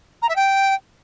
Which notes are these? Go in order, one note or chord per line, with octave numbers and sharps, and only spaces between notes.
A#5
E5
G5